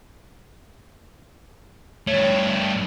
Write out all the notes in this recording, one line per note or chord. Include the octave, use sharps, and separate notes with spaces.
G2 A3 C#5